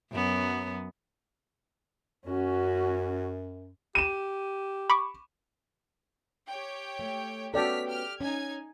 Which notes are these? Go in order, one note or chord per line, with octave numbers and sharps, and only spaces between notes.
F#2 F#3 B3
F#2 C#4 F#4
G4 D#7 E7
B5 C#6 D6
G4 C#5 G5
A3
B3 C#4 F#4 A4 D5 G5 F6 B6
G4 F6
C#4 D#4 G#5 G#6